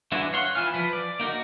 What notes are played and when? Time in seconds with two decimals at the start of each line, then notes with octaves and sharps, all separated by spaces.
0.12 E3 G#3 D4 E4 F#4
0.33 C#5 F5 F#5 C6
0.55 E3 E4 F4 G#5 F6
0.74 F3 B4
0.93 D5
1.19 A#3 D#4 F#4 A#4